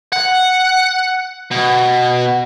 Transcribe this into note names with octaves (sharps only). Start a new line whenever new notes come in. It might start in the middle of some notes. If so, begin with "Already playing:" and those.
F#5
B2